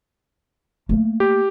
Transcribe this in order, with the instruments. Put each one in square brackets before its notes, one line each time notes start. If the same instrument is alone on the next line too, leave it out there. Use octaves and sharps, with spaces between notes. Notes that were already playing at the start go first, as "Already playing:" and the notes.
[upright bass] A3 A#3
[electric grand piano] G4